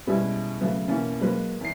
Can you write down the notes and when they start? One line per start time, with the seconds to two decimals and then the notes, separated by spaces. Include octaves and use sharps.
0.07 B2 G3 G#3 B3 C#4 E4
0.61 C#3 F#3 A3 B3
0.88 B2 E3 A#3 C#4
1.21 F#3 G#3 A#3 B4
1.61 E2 C7